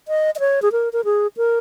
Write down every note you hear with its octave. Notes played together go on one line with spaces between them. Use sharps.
D#5
D#5
C#5
G#4
A#4
A#4
G#4
A#4